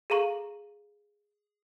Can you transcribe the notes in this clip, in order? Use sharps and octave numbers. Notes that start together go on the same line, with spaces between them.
G#4 A4 F5 A#5 C#6 F#7